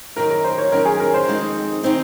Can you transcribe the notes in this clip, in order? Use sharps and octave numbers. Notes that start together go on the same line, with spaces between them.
D#3 F#3 C#4 A#4
A#4
C5
C#5
D#3 F#3 C#4 A#4
G#4
A#4
C5
F2 D#3 G#3 C4 D#4
D#3 G#3 C4 D#4